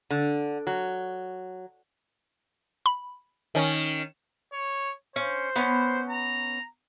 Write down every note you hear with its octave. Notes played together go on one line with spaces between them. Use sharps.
D3
F#3
B5
D#3 C#4
C#5
C#4 C5
B3 C#4
A#5